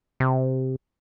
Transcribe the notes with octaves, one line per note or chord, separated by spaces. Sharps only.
C3